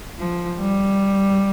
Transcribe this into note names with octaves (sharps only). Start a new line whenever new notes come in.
F3
G3